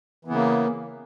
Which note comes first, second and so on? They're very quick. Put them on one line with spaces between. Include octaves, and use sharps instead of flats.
E3 B3 C#3 A#3